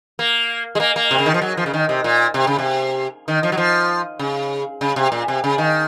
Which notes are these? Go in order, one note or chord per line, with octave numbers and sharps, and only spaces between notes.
A#3
G#3
A#3
A#3
C3
C#3
D#3
F3
F#3
F3
C#3
D#3
C3
A#2
C3
C#3
C3
D#3
F3
F#3
F3
C#3
C#3
C3
A#2
C3
C#3
D#3